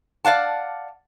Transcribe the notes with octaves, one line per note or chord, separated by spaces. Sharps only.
D5 F5 F#5 A5